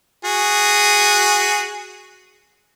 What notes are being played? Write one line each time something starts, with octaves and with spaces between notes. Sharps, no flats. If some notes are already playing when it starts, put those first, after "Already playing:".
F#4 G#4